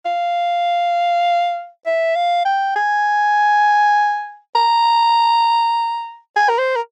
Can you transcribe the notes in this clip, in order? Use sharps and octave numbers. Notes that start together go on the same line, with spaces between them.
F5
E5
F5
G5
G#5
A#5
G#5
A#4
C5
A#4